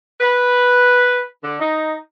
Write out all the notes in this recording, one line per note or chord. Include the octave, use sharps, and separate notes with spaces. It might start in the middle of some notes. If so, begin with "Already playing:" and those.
B4
D3
D#4